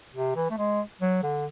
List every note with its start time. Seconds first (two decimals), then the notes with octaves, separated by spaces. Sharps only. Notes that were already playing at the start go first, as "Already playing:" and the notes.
0.14 C3
0.36 E3
0.50 A3
0.58 G#3
1.01 F#3
1.23 D3